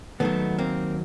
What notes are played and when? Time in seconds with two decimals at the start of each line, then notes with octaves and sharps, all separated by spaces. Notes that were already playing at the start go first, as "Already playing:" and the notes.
0.20 D#2 D#3 F#3 A3 B3
0.58 A#3 C4